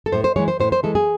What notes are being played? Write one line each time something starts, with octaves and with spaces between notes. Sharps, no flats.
A4
A2 C5
C5
E3 G#3 C#5
C5
A2 C5
C5
E3 G#3 A4
G#4